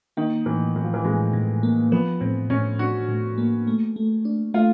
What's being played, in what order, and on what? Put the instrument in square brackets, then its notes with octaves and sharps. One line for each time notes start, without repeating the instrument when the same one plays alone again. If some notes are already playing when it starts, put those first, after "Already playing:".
[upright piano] D#3 [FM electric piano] A#3
[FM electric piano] A2 [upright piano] E3
[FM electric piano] A2 [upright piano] E3
[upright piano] F3
E3
[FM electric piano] A2 [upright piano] G#3
[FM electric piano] A2
A#3
[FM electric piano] F3 [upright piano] B3
[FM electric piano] A2 [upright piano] C4
[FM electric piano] A2 [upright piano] C#4
[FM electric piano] D4 [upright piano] F#4
[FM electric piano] A2
A#3
A3
A3
D4
[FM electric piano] A3 [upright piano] F4